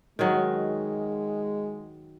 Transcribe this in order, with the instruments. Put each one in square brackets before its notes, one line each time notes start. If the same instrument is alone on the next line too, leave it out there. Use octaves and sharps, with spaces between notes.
[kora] D#3 F#3 [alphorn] G#3